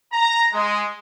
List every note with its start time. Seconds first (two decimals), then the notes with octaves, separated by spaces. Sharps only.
0.13 A#5
0.53 G#3